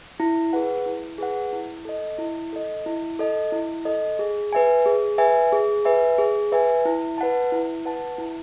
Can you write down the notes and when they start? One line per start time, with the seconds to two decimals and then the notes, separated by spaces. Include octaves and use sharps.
0.20 E4
0.53 G#4 B4 F#5
0.86 E4
1.18 G#4 B4 F#5
1.53 E4
1.85 A4 D#5
2.18 E4
2.53 A4 D#5
2.86 E4
3.19 A4 D#5
3.52 E4
3.85 A4 D#5
4.19 G#4
4.53 B4 E5 G#5
4.86 G#4
5.18 B4 E5 G#5
5.52 G#4
5.85 B4 E5 G#5
6.18 G#4
6.52 B4 E5 G#5
6.85 E4
7.18 B4 F#5 A5
7.52 E4
7.86 B4 F#5 A5
8.18 E4